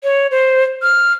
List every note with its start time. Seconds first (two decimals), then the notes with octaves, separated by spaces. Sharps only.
0.04 C#5
0.31 C5
0.82 F6